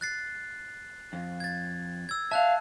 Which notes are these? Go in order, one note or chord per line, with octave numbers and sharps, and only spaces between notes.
F#6 A6 C7
F2
G#6 A6
E6 G#6
E5 F5 A5 F#6